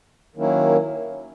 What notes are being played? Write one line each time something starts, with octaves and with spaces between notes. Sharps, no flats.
D#3 F#3 A#3 C#4 E4